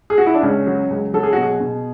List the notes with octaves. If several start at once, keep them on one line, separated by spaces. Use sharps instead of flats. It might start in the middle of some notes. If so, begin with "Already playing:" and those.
G#4
F#4
E4
D4
C#2 C#4
F#3
C#2
F#3 A4
G#4
B2 F#4
G#4
B2